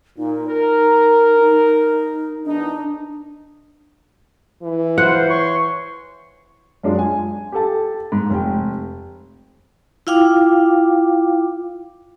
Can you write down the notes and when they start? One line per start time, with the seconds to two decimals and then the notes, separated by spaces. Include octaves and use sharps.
0.18 A#2 D#4
0.48 A#4
1.40 D#4
2.46 E2 D4 D#4
4.63 E3
4.98 F4 B4 C5 F#5
5.29 C#5 C6 C#6
6.83 F#2 G#3 D4 F4
6.99 G#5
7.52 G4 A4 A5
8.12 G#2
8.30 F1 G5
10.07 E4 F4 F5 G5 D6